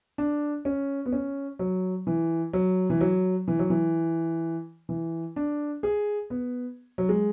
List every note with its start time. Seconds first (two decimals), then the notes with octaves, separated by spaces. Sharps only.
0.18 D4
0.65 C#4
1.06 B3
1.13 C#4
1.59 F#3
2.07 E3
2.53 F#3
2.90 E3
3.01 F#3
3.48 E3
3.59 F#3
3.70 E3
4.89 E3
5.36 D4
5.83 G#4
6.30 B3
6.98 F#3
7.09 G#3